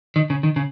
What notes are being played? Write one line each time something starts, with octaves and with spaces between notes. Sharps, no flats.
D#3
C#3
D#3
C#3